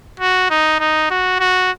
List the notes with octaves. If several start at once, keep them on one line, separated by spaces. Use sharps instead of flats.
F#4
D#4
D#4
F#4
F#4